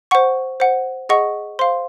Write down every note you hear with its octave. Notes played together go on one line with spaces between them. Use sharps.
C5 F#5 C#6
C5 F#5
G#4 D#5 F#5 C#6
C5 F5 C6